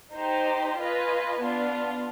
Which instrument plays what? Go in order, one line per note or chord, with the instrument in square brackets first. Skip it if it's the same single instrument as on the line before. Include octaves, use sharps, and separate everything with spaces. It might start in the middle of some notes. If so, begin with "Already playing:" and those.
[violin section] D#4 G4 C5
F4 B4 D#5 G#5
B3 D4 F4